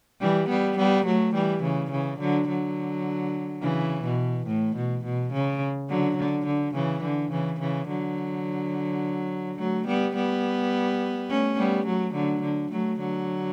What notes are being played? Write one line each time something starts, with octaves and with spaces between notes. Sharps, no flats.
E3 G3
G3 B3
G3 B3
F#3 A3
E3 G3
C#3 E3
C#3 E3
D3 F#3
D3 F#3
C#3 E3
B2
A2
B2
B2
C#3
D3 F#3
D3
D3
C#3 E3
D3
C#3 E3
C#3 E3
D3 F#3
F#3 A3
G3 B3
G3 B3
A3 C#4
G3 B3
F#3 A3
D3 F#3
D3
F#3 A3
D3 F#3